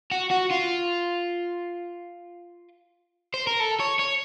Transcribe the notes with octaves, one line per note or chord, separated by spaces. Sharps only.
F#4
F#4
F4
C5
A#4
A4
C#5
C#5